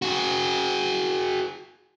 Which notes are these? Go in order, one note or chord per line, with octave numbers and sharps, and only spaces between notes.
F#4 G#4